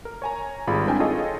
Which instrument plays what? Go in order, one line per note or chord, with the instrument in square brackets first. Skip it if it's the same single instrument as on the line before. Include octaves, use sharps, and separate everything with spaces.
[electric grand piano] A#4
C#5 G#5 A#5
G#1 G3 F4 G#4 B5
C4 D4 E4 A#4 G5 G#5
D#4 F4 G#4 A4 C#5 D#5